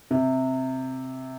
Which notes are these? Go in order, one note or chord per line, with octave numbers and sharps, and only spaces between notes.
C3